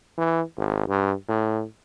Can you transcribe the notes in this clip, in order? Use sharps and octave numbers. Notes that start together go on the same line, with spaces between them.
E3
G#1
G2
A2